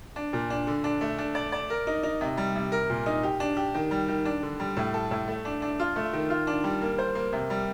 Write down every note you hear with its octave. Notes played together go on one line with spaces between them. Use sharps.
D4
A#2
D4
D3
D4
A3
D4
D5
D5
A#4
D#4
D#4
C3
G3
C3
A#4
A#2
D#4
G4
D4
G4
D#3
G3
D#3
D4
D3
G3
A2
A4
A2
A3
D4
D4
F4
A3
D#3
F4
D4
G3
A#3
C5
A#3
C3
G3